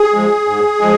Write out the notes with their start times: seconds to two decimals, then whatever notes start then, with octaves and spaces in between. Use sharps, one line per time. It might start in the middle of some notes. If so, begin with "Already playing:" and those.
Already playing: G#4
0.14 F3 G#3
0.48 G#2
0.81 F3 G#3